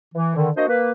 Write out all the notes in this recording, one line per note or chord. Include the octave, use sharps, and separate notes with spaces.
E3
D3 D#3
A#3 D4 F#4 C5 D#5
A#3 B4